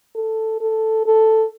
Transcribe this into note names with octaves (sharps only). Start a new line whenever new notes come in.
A4
A4
A4